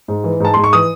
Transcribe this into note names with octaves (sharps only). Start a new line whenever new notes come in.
G#2
E3
G#2 A5
G#2 C6
C#6
E3 D#6